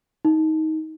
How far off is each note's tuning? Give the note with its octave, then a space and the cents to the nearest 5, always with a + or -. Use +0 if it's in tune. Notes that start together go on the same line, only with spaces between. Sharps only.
D#4 +20